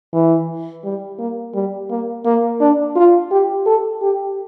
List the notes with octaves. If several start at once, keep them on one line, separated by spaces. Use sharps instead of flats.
E3
G3
A#3
G3
A#3
A#3
D4
F4
G4
A4
G4